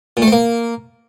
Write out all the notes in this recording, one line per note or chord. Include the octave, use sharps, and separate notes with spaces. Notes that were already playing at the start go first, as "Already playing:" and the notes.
A#2
A3
C4
A#3